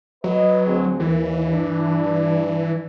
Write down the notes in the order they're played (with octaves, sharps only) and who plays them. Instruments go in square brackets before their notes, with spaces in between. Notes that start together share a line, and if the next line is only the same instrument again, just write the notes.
[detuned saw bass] F#3 [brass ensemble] B4 D#5
[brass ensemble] D2 C4 G#4
[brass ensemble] D#2 [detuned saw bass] E3
[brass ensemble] G2 D4